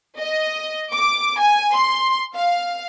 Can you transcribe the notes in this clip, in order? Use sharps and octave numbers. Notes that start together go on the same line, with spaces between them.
D#5
D6
G#5
C6
F5